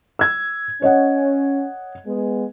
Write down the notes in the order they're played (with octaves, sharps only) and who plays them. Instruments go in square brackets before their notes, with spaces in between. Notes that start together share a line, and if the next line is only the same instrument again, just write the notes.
[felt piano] E6 G#6
[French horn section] C#4 [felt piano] C#5 D#5 F#5
[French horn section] G#3 B3